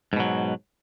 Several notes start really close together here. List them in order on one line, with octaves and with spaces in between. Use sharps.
G#2 B2 F#3